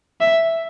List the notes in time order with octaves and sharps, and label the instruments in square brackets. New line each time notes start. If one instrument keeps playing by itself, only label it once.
[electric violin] E5